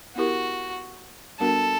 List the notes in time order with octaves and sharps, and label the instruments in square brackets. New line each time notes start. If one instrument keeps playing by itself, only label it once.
[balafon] B3 E4 G4 A#4 [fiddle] F#4
[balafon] G3 B3 D4 F#4 A#4 [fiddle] A4